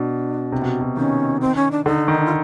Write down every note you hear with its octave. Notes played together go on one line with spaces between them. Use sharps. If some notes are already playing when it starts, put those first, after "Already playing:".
Already playing: B2 D4
C3
B2
B2
D#3 C#4
C4
C#4
D4
D3 D#4
D#3
F4